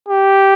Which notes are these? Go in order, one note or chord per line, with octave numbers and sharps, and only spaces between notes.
G4